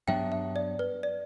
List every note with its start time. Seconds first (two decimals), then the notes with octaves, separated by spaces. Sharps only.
0.08 G2 F#3 B3 D4 E5 G5
0.32 E5
0.56 D5
0.79 B4
1.03 D5